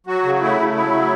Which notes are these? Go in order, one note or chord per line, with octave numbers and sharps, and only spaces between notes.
F#3 F#4
C#3
A3 E4
C#3
F#3 E4
C#3